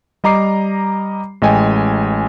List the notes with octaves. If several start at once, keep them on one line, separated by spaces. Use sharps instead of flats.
G3 D#5 A#5 D6 C7
A1 G#3 D#5 G5 G#5